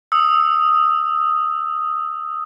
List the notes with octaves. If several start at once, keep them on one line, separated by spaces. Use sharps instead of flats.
D#6 E6